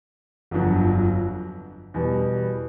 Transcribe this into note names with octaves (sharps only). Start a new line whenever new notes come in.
G1 F2 D3 F#3
E2 B2 G3